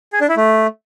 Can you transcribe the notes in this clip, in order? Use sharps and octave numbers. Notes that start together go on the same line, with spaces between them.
G#4
D4
E4
A3